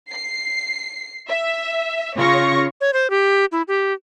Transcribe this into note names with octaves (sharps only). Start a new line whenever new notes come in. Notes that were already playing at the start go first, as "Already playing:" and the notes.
C7
E5
C#3 F4 C#5 C#6 A#6
C#5
C5
G4
E4
G4